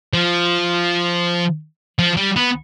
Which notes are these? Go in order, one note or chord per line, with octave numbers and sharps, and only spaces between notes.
F3
F3
G3
B3